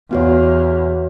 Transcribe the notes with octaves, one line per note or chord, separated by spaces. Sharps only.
E2 B3 F#4 C#5